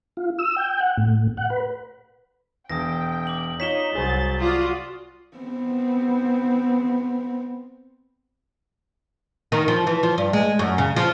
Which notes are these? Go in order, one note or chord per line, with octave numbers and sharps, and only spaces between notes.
F4
E6
G5
F#5
A2
F#5
B4
E1 G5 D#6 A#6
D6 F#7
D#4 F4 C#5 B6 E7 G7
C2 F#3 G#4 C5 A6
F4 F#4 D5 D#6
B3 C4
D#3
F3
E3
F3
G2
G#3
F#2
C#3
F3